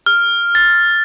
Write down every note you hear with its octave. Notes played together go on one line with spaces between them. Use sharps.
F6
A6